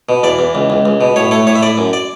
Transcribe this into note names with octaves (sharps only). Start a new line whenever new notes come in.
B2
E2 D5
E2
C#2
C#2
C#2
B2
A2 C#5
A3 C#5
A2 C#5
E5
A2 D5
F#2
D5